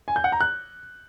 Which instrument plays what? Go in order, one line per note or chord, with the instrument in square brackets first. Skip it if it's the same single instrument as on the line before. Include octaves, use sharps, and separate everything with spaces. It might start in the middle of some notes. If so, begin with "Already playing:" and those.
[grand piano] G#5
G6
F#5
A#5
F#6